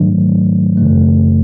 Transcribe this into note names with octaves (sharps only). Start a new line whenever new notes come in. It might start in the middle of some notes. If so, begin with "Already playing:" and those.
Already playing: G#2 D#3 F#3 A3 D4
F#2 C#3 E3 A3